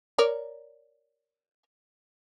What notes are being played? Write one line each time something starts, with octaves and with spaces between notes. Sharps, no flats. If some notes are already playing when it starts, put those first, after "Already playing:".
A#4 C#5 D5